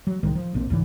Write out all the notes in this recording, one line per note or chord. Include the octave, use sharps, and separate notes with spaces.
F#3
C2 A2 D#3 G#3
F3
A#1 A#2 C4
C#2 G#2 E3